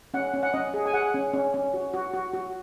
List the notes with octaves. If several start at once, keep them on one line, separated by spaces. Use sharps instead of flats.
C#4 F#5
C#4
F#5
C#4 D#5
G#4
G#5
G#4 F#5
C#4
C#4
C#4
F#4
F#4
F#4
F#4